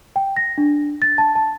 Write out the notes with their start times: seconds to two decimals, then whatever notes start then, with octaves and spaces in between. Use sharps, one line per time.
0.16 G5
0.37 A#6
0.58 D4
1.02 A6
1.18 A5
1.35 A5